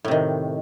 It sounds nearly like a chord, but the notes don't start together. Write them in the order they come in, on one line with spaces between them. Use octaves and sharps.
A2 C3 D#3